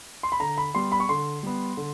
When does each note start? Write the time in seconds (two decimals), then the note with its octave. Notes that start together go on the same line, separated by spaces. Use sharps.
0.23 C6
0.32 B5
0.40 D3 A#5
0.58 B5
0.75 G3 B3 C6
0.92 B5
1.00 C#6
1.09 D3 C6
1.43 G3 B3
1.77 D3